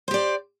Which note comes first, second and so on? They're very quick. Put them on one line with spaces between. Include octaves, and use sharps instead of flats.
C5 G4 D5